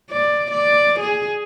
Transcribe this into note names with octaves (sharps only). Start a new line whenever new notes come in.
D5
D5
G#4